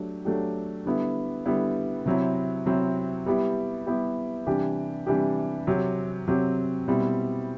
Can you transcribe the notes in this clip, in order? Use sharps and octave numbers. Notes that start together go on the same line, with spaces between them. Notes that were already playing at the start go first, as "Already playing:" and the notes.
Already playing: F#3 A3 D4 G4
F#3 A3 D4 G4
D3 G3 B3 E4
D3 G3 B3 E4
C3 F#3 C4 E4
C3 F#3 C4 E4
G3 B3 E4 G4
G3 B3 E4 G4
C3 E3 G3 D4 G4
C3 E3 G3 D4 G4
C3 F#3 C4 G4
C3 F#3 C4 G4
B2 G3 C4 E4